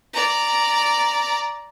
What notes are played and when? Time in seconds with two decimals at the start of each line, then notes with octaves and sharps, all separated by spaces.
0.13 D5 A#5